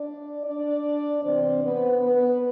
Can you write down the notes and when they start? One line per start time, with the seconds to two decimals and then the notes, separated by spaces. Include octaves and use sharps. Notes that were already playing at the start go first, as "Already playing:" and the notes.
Already playing: D4 D5
0.44 D4 D5
1.22 E2 C3 E3 C4 C5
1.62 B3 B4
2.01 B3 B4